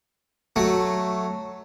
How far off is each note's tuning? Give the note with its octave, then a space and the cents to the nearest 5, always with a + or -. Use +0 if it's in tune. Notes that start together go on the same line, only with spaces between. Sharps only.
F#3 +0 A3 +0